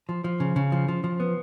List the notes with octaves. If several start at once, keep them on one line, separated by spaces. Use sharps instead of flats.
F3
F3
C#3
C#3
F3
F3
F3
B3